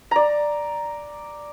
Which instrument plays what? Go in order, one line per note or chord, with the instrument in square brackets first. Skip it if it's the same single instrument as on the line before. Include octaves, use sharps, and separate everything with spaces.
[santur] D5 A#5